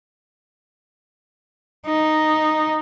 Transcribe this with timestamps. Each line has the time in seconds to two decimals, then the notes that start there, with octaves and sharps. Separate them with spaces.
1.87 D#4